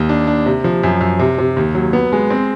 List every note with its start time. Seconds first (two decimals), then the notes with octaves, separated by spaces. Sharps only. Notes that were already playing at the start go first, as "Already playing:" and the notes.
Already playing: D#2
0.09 D4
0.27 D4
0.46 C3
0.64 F3
0.83 F#2
1.01 F#2
1.19 C3
1.38 C3
1.57 D#2
1.75 F#3
1.93 B3
2.12 G#3
2.30 C4